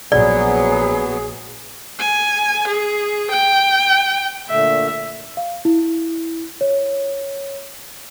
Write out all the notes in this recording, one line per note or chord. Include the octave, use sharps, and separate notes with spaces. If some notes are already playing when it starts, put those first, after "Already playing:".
A#1 F#3 B3 G#4 D5
G#5
G#4
G5
A#2 D3 A3 E5
F5
E4
C#5